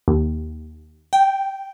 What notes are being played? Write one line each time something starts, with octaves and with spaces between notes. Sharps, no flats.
D#2
G5